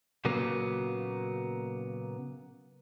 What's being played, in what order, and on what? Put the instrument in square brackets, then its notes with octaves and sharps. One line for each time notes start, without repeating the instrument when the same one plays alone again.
[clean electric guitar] A#2 C#3 F#3 A#3 B3